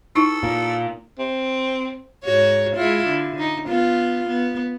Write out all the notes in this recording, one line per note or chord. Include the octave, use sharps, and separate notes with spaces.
D#4 E4 A4 C#6
A#2
C4
G#2 F#4 C#5
G#3 E4 F4
D3
D#4
B3 F4
B3